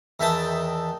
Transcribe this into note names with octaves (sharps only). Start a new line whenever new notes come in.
E2 D#3 E5 G5 A5 D#6